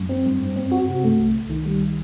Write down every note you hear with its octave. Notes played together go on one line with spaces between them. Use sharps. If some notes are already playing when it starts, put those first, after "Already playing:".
Already playing: F#2
C4
G2
G2
C4
F#4
C3
A3
C2
C2
D#3
G3